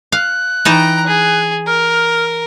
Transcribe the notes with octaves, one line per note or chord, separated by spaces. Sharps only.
F5 F#6
E3 D#4 G5 A5 A#5
G#4
A#4 F6